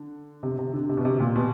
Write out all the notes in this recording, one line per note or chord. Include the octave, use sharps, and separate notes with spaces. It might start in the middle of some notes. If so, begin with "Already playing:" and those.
Already playing: D3
C3
C3
D3
C3
B2
C3
A#2
B2